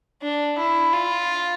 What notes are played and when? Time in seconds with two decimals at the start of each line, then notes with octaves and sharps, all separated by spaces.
0.22 D4
0.59 E4
0.93 F4